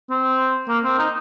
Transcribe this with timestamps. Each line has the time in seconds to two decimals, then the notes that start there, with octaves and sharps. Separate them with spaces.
0.10 C4
0.68 A#3
0.84 C4
0.98 D#4